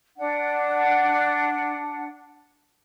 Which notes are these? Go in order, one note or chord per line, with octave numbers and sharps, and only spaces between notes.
D4 F#5